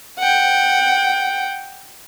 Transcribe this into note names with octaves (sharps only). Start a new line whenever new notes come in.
F#5 G5